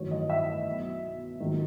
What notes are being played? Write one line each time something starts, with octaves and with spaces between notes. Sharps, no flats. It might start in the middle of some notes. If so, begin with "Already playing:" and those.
Already playing: A1 G2 D#3 F#3 C#5
D#5
E5
B1 B2 F#3
A#1 G#2 D#3 F#3